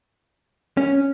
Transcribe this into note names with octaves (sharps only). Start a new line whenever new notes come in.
C#4